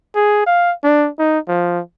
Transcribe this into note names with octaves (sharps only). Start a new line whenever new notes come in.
G#4
F5
D4
D#4
F3